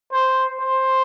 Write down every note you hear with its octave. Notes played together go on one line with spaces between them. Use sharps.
C5
C5